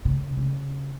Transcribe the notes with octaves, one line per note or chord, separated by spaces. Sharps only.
C#3
C#3